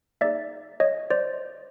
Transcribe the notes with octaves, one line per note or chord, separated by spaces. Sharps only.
A#3 D#4 G#4 D5 E5
C#5 D#5
C5 D5